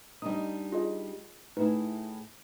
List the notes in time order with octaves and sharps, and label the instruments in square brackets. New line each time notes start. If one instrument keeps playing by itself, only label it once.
[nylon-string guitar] G3 D4 D#4 [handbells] D#5 D#6
[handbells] F4 G#4 D#5
[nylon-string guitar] A2 E4 G#4 [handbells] D#4 B4